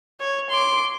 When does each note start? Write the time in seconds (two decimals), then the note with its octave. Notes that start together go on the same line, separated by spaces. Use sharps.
0.20 C#5
0.50 C6 D6